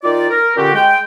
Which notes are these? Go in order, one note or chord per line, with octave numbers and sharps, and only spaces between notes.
D#3 D#4 F4 D5
A#4
A#2 D3 C#4 F#4 G4
G#3 G5